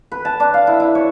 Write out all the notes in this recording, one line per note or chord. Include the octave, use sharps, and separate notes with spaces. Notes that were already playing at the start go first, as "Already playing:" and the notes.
B4
A5
D4
F5
E4
E4
C#5